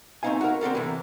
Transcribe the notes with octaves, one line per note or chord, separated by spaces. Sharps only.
A3 C4 C#4 D#4 F5 G#5
F#4 A#4
C4 D4 A4 A#4
C3 E3